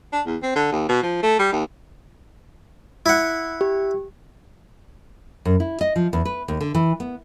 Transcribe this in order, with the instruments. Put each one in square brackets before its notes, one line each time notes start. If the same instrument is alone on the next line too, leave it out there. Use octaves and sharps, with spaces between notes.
[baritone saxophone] D4
E2
C4
D3
D#2
B2
F3
A3
G3
D#2
[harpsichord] E4 F#5
[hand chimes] G4
[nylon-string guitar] F#2
E4
D#5
F3
E2
B4
D#2
D3
E3
B3